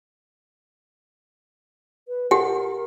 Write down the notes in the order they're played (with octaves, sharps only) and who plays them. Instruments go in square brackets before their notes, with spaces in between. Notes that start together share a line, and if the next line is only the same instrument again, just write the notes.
[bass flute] B4
[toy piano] G4 F#5 [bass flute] A#4